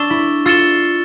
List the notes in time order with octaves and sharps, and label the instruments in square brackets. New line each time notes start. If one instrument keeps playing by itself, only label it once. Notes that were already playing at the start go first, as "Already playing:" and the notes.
Already playing: [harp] D4 [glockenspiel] C#6 E6 A6 E7 G7
[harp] E4
[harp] F4 [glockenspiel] E6 A6 C#7 E7 G7